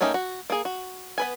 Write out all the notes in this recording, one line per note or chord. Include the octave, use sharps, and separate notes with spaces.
A3 A#3 C#4 D#4 G4
F#4
A#3 G#4
F#4
B3 B4 G#5